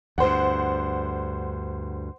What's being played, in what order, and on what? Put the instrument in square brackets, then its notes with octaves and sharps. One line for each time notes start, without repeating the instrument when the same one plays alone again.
[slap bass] D2 G2 [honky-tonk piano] C5 F#5